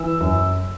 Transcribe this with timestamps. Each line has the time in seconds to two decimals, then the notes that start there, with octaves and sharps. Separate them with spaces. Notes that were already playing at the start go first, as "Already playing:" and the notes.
Already playing: E3 E6
0.21 F#2